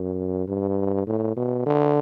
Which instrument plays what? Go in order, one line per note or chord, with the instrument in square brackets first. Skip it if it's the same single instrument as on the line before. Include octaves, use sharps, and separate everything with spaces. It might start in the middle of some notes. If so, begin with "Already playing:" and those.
Already playing: [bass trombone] F#2
G2
A2
B2
D3